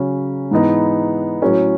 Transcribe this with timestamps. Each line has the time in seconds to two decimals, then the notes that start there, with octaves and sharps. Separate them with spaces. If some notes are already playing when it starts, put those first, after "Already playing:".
Already playing: C#3 F#3 C#4
0.51 G#2 E3 B3 D#4
1.42 A2 F#3 C#4